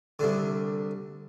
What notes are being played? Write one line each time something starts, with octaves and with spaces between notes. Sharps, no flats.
C2 D3